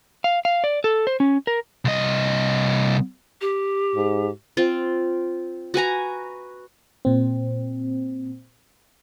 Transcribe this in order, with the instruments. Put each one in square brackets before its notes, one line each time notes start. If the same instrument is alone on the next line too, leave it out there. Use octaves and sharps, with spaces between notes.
[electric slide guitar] F5
F5
D5
A4
C5
C#4
A#4
[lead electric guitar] C2 D#5
[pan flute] G4
[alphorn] G#2
[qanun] C4 F4
F#4 B4 G#5 A#5
[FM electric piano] A#2 C4